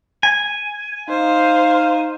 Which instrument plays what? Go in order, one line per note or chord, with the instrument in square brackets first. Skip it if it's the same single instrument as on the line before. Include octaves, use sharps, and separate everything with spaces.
[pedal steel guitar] G#5
[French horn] D#4 [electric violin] C5 [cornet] F5